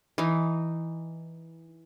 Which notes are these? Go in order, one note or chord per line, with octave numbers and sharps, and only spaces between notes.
E3 D#4